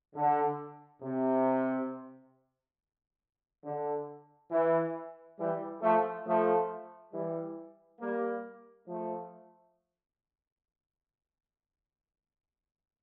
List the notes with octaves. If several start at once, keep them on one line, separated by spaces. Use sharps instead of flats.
D3
C3
D3
E3
E3 G3
F3 A3
F3 A3
E3 G3
G3 A#3
F3 A3